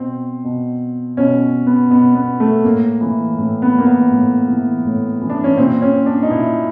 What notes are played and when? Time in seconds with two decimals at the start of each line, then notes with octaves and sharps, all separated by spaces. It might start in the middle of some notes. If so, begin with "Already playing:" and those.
Already playing: B2 C4
0.44 B2
1.17 B2 C#4
1.67 B3
1.91 B2 B3
2.15 B3
2.40 A3
2.64 A2 A#3
3.01 E3
3.38 A2
3.62 B3
3.74 E3 A#3
3.86 B3
4.11 A2
4.48 E3
4.84 A2
5.21 E3
5.30 D4
5.44 C#4
5.58 A#2 C4
5.82 C#4
6.06 D4
6.22 D#4
6.30 A#2 E4